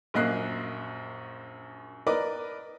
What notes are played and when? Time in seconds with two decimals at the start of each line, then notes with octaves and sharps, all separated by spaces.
0.14 A#1 F#2 A#3 D#5 F#6 C7
2.07 A#4 B4 D5 D#5 D6